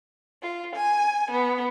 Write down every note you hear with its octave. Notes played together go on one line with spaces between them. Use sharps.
F4
G#5
B3